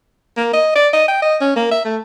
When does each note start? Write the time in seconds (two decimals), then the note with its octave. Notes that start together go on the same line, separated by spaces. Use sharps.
0.37 A#3
0.53 D#5
0.75 D5
0.93 D#5
1.08 G5
1.22 D#5
1.41 C#4
1.56 A#3
1.71 E5
1.85 A3